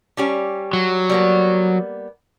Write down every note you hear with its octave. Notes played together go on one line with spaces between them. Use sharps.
G3 C#4 G4
F#3
G3 A#3 B3